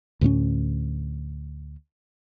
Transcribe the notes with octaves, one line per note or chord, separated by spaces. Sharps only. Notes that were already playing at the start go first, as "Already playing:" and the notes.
D2 A2 A#3 C#4